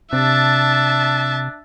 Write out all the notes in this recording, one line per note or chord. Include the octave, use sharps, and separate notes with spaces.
C3 D4 E5 A5